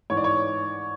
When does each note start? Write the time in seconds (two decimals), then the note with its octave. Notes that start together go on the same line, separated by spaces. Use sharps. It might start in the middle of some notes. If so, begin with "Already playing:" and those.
0.10 G#2 E3 C#5
0.17 D5
0.24 C#5